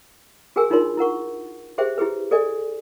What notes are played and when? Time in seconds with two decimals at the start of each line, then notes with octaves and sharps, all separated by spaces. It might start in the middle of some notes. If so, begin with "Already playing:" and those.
0.56 F#4 G#4 A#4 G5 G#5 E6
0.70 D4 D#4 F4 A#4 C#5 C6
0.97 E4 A#4 F#5 C#6
1.78 G4 G#4 C5 E5 G5
1.98 E4 G4 G#4 B4
2.31 G#4 A4 D5 D#5 G#5